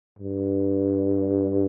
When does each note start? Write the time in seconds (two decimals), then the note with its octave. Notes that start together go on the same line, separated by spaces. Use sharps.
0.19 G2